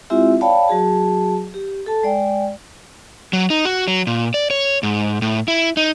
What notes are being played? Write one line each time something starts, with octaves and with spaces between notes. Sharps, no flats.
G#3 C4 E4 F4 G4 E5
C#5 D5 F5 G5 A5 B5
F#3 F#4 G#4 A5
G4
A4 A5
G#3 D5 G5
F#3
D#4
F#4
F#3
A#2
D5
C#5
G#2
A2
E4
D#4